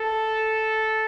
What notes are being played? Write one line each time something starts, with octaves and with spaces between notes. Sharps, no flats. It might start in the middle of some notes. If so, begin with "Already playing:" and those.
Already playing: A4